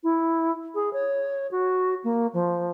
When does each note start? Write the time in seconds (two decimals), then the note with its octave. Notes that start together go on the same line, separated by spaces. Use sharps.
0.03 E4
0.75 G#4
0.93 C#5
1.51 F#4
2.04 A#3
2.33 F3